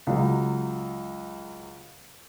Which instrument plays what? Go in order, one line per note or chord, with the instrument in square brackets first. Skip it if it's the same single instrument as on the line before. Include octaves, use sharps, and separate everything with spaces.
[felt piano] C#2 F#3